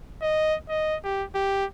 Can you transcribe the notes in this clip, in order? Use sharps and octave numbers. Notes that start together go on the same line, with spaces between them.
D#5
D#5
G4
G4